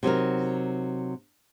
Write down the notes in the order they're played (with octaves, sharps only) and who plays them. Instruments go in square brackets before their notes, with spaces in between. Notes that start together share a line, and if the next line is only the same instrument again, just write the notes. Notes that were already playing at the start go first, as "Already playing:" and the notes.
[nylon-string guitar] C3 F#3 D#4 A#4